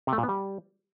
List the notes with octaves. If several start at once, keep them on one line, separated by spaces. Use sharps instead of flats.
C3
A3
A#2
B3
G3